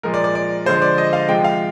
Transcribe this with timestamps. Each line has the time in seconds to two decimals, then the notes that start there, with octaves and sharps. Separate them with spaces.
0.03 A#2 F3 G#3 A#4
0.14 D5
0.24 D5
0.35 D5
0.66 D3 F3 G#3 C5
0.82 D5
0.98 D#5
1.13 F5
1.28 C3 F3 G#3 G5
1.44 F5